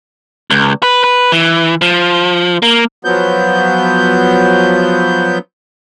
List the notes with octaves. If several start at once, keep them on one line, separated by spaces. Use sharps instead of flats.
C#2
B4
B4
E3
F3
A#3
F3 F#3 B3 G6